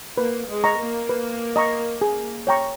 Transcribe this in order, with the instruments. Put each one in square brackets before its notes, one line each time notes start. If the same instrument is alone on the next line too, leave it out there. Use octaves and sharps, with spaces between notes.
[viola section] A#3 [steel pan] B4
[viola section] G#3
[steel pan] D#5 A#5 C#6
[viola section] A#3
[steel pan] B4
D#5 A#5 C#6
G#4
C#5 G5 A#5 C#6